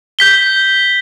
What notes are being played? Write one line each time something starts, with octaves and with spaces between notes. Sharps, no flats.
G6 B6 G7